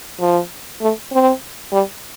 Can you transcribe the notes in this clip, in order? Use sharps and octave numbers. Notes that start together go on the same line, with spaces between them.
F3
A3
C4
G3